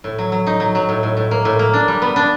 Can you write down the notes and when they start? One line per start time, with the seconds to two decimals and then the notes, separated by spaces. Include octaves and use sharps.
0.04 A2
0.18 F#3
0.32 F#3
0.47 D#4
0.60 F#3
0.75 F#3
0.89 A2
1.03 A2
1.17 A2
1.31 A#3
1.45 A2
1.59 A#3
1.73 D4
1.88 G3
2.02 B3
2.16 D4